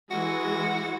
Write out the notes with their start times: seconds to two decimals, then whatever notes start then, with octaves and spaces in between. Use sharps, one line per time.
0.11 E3 G#3 F#4